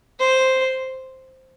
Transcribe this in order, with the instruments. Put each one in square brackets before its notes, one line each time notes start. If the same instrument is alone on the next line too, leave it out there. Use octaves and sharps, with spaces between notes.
[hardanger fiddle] C5